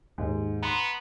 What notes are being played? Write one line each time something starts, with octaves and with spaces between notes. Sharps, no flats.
D#2 G#2
B3 A#5 C6